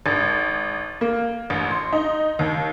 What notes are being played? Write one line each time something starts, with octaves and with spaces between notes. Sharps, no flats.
G#1
A#3
A1
C6
D#4
D#2